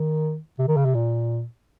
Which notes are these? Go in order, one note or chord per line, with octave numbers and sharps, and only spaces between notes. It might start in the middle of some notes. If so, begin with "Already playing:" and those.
Already playing: D#3
C3
D#3
C#3
C3
A#2